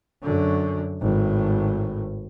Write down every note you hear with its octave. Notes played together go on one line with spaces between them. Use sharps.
F#2 D3
G#1 A2